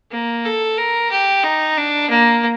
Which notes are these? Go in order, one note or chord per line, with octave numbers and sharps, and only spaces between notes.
A#3
A4
A#4
G4
D#4
D4
A#3